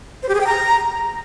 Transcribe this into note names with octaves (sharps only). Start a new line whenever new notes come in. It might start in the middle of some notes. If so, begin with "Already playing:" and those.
C5
G4
G#4
G5
A#5